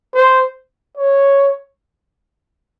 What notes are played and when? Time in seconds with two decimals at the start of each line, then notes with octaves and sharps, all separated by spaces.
0.14 C5
0.98 C#5